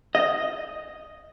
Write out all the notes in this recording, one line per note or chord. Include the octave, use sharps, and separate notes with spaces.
D#5